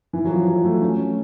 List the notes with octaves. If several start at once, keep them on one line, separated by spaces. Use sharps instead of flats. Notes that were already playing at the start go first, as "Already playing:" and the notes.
E3
F#3
F3
F#3
A3
C#4